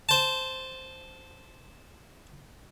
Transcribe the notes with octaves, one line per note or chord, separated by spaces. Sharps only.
C5 A5